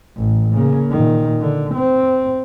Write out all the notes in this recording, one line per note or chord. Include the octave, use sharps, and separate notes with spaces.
A1
C#3 A#3
A#2 D#3
D3
C4